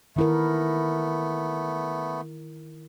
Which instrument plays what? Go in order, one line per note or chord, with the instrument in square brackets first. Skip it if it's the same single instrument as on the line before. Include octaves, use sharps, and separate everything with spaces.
[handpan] D#3 E4 A#4 [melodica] A3 B3